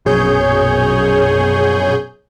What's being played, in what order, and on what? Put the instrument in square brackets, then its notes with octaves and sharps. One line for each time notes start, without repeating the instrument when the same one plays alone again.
[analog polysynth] A#1 F#2 B2 G#4 C#5 G6